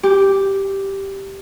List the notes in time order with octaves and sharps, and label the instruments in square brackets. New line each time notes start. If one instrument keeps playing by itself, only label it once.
[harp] G4